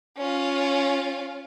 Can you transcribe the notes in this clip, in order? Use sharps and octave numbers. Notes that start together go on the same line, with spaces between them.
C#4 F4